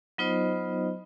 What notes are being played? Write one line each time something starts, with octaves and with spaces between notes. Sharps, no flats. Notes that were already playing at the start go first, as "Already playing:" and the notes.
F#3 B3 D#4 F4 C5 D#5